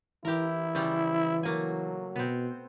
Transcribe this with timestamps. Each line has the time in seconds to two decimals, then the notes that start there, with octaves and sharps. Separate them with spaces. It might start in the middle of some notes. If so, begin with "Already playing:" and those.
0.25 E3 E4 G4 A#4
0.75 C#3 F3 G3
1.43 F#3 A3 A#3 G#5
2.16 B2 B3 C4